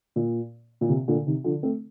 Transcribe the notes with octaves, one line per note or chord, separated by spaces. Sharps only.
A#2
A#2
C3
A#2 D3
C3 D#3
D3 F3
A3 C4